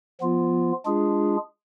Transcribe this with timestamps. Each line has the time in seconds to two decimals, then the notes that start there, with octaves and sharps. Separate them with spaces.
0.21 F3 B3 F4
0.85 G#3 D4 F4 G#4